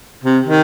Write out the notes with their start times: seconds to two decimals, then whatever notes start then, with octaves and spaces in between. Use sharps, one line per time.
0.23 C3
0.46 D#3